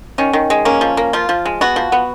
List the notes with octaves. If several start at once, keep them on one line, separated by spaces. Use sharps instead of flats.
D#3 C#4
D#3
G#3
A#3 C#4
F3
A#3
F3 F4
F3
G#3
B3 F#4
F3
B3